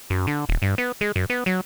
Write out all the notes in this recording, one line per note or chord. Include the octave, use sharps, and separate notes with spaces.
F#2
D3
D#1
G2
B3
G#3
F#2
B3
F#3